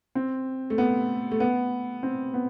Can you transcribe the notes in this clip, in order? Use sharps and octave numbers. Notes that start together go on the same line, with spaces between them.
C4
A3
B3
A3
B3
C4
B3